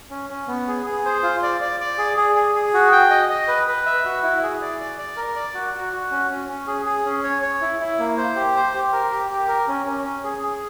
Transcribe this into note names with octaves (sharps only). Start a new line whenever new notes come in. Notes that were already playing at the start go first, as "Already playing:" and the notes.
C#4
C#4
B3
G#4
G#4
C5
F4
D5
D5
D5
G#4
G#4
G#4
G#4
F#4
G5
D#5
D#5
B4
B4
E5
F#4
E4
G#4
D5
D5
D5
A#4
D5
F#4
F#4
F#4
C#4
C#4
C#4
G#4
G#4
C#4
C#5
C#5
E4
E4
A#3
C5
G4
C5
G4
A#4
G4
G4
A#4
C#4
C#4
C#4
G#4
G#4